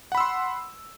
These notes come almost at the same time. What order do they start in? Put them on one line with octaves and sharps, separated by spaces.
F#5 B5 E6 C6